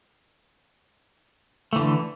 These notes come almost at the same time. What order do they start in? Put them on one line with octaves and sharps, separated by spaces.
A3 E3 D3